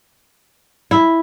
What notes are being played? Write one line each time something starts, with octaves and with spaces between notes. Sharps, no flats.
E4